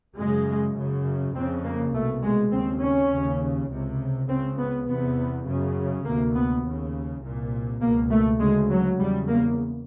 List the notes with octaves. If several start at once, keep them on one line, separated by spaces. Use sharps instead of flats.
F#2 C#3 G#3
F#2 C#3
F2 C#3 C4
A#3
C2 B2 A3
G#3
D#2 C#3 C4
C#4
D#2 C#3
C#2 C3
C#2 C#3 C4
B3
E2 C3 B3
F#2 C#3
D2 C3 A#3
B3
D#2 C#3
C2 A#2
C#2 B2 A#3
A3
D2 C#3 G#3
F#3
E2 C#3 G3
A#3